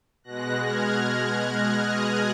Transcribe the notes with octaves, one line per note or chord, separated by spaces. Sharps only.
B2 G#3 F#6 A#6
F6 G#6
D#6 F#6